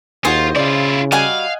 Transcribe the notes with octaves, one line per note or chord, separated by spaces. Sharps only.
D#2 F4 F#4 G#4 C5 D#5
C#3 E4 F4 D5
G3 F#4 D#5 F5 F#5 G#5